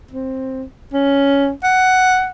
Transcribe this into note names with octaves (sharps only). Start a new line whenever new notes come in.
C4
C#4
F#5